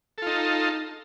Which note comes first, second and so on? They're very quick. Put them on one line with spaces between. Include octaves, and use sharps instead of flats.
A4 F4 D#4